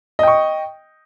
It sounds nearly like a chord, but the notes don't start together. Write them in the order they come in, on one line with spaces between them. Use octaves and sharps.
D#5 G5 C#6